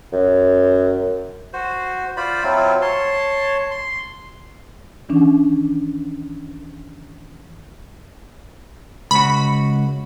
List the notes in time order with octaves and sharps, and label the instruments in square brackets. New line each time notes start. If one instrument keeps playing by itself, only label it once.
[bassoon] F#2
[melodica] F#4 C5
F4 C5 D5 B5
F#3 C4 E4 F4
C#5 A5 C6
C6
[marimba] D#3 E3 C#4 D4
[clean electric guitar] C#2 F#4 [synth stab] B5